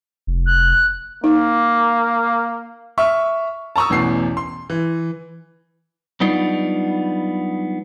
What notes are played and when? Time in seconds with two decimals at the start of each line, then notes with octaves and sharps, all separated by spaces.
0.27 F1
0.46 F#6
1.24 A#3 D#4
2.98 E5 C#6 E6 F6
3.76 A5 A#5 C#6 D#6 E6
3.90 A1 E2 B2 C7
4.37 C6
4.70 E3
6.21 F#3 G3 B3 D4 D#4 F4